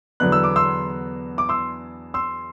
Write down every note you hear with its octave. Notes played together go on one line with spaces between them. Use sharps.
E2 D3 F#3 B3 D4 F#6
E6
D6
C6 E6
D6
C6 E6
C6 E6